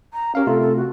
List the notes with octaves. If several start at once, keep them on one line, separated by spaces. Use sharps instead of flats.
A#5
C#4 G4 A#4 F5
C3 A3 F4 A4
A4
F#4